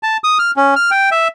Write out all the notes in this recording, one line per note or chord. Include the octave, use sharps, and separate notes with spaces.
A5
D#6
F6
C#4
F6
G5
E5